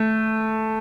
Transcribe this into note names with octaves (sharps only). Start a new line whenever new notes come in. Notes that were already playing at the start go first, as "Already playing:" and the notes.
Already playing: A3